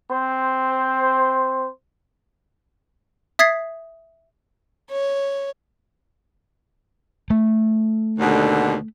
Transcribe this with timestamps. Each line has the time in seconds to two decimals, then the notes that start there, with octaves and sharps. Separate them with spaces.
0.11 C4 C5
3.39 E5 D#6 G#6 A6 B6 C7
4.90 C#5
7.30 A3
8.19 D#2 B2 D3